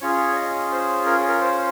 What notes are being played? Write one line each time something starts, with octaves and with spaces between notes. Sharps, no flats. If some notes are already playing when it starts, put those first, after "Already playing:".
C#4 F4 G#4 C#5
D#5
C5
A#4
G#4
A#4
C5